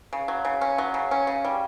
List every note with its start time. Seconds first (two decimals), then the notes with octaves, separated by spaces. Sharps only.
0.13 C#3
0.28 F#3
0.45 C#3
0.61 C#4
0.78 F#3
0.94 C#3
1.11 C#4
1.27 C#3
1.45 G3